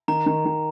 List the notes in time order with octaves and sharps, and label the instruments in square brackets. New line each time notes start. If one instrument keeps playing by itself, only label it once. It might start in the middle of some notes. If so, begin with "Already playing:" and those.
[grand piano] D#3 [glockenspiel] A#5
[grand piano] D#3
D#3